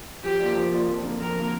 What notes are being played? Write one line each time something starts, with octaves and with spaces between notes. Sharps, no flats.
F3 G4
A#3 F4 D5
F3
A#3 F4 D5
F2
D3 A#3
F2 A#4
D3 A#3